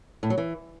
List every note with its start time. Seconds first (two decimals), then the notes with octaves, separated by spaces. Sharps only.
0.23 A2
0.30 F#3
0.38 E3